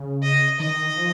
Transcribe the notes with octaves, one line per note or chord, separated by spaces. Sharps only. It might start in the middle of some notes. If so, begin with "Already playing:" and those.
Already playing: C#3
D#5
D#3 D#5
F3